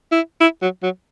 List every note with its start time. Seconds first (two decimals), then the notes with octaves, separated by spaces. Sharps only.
0.11 E4
0.41 E4
0.62 F#3
0.82 F#3